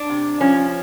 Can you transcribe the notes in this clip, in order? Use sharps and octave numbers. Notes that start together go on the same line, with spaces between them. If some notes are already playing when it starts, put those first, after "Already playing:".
Already playing: D4
C3
F3 C#4